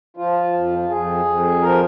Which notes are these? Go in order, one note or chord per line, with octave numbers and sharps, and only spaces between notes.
F3 F4
F2
F2 G#4
F2
F3 A#4